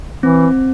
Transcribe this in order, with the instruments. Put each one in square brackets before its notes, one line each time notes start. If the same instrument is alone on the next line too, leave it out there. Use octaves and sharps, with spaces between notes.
[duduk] E3 [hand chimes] C4